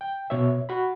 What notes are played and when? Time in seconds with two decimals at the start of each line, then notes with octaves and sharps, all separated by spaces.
0.01 G5
0.30 B2 C#5 E5
0.69 F#4 B5